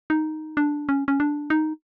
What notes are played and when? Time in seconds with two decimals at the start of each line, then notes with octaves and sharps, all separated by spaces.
0.10 D#4
0.57 D4
0.89 C#4
1.08 C#4
1.20 D4
1.50 D#4